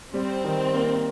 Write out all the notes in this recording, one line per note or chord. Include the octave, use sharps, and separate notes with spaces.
G3 C4
D#3
A#3